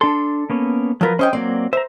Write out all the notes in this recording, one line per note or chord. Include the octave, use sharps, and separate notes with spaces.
D4 A4 C6
A#3 B3 C#4
F3 F#3 F4 A#4 B4
C#4 C5 D#5 G5
F#3 A#3 C4 D5
C5 E5 A#5